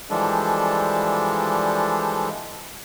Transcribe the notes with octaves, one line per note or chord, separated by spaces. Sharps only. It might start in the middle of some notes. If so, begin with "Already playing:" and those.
E3 F3 G3 G#3 D4 A4